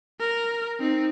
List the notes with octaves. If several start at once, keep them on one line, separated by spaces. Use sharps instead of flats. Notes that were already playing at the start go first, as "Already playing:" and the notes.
A#4
C4 D#4